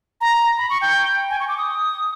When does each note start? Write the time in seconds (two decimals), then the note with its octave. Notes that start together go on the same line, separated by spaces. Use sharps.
0.21 A#5
0.58 B5
0.70 C#6
0.81 G5
1.30 G#5
1.40 C#6
1.48 D6
1.58 D#6